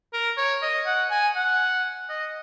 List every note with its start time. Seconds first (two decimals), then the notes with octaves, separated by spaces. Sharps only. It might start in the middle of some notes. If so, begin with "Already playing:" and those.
0.13 A#4
0.37 C#5
0.62 D#5
0.86 F#5
1.11 G#5
1.36 F#5
2.09 D#5